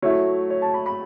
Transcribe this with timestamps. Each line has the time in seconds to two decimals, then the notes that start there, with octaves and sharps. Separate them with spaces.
0.02 F#3 A3 E4 C#5
0.50 C#5
0.62 A5
0.74 B5
0.86 B5